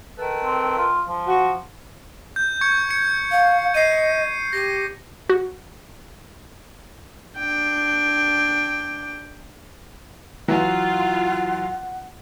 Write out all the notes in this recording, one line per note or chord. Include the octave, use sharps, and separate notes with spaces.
D#3 A4 B4
C4
F4
F3
F#4
G6
C#6 G#6 C#7
C#7
F5
D#5 C7 D#7
G4 A#6
F#4
D4 G5
E3 F#3 F4 F#5 G#5